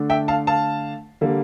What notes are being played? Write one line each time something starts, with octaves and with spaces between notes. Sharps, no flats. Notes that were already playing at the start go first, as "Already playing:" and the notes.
Already playing: D3 A3 D4
E5 G5
F5 A5
F5 A5
D3 G3 A#3